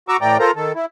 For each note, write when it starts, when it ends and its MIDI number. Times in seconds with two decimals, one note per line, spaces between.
0.08 0.17 66
0.08 0.17 82
0.08 0.17 85
0.08 0.17 86
0.08 0.17 88
0.21 0.37 45
0.21 0.37 52
0.21 0.37 57
0.21 0.37 74
0.21 0.37 79
0.21 0.37 82
0.39 0.51 65
0.39 0.51 69
0.39 0.51 70
0.39 0.51 72
0.39 0.51 82
0.56 0.73 51
0.56 0.73 69
0.75 0.85 64